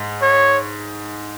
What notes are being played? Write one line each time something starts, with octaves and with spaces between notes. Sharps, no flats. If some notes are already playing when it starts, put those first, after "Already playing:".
Already playing: G#2
C#5